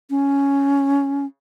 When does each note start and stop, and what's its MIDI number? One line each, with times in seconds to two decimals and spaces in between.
0.10 1.26 61